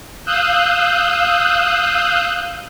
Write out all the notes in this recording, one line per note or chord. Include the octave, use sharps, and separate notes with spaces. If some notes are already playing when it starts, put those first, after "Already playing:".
F5 D#6 E6 F#6 G6